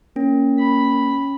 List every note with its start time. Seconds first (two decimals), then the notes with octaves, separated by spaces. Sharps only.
0.16 A#3 C#4
0.59 B5